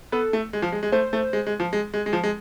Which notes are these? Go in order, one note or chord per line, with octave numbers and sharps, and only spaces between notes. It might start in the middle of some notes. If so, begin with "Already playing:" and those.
B3 A4
A3
G#3
F3
G#3
G#3
A3 C5
A3
G#3
G#3
F3
G#3
G#3
G#3
F3
G#3